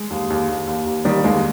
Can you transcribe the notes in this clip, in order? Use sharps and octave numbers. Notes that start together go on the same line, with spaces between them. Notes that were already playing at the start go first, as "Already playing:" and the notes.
Already playing: G#3
D#2
D#2
D#2
D#2
D#2
D#3 G3
D#2 G#3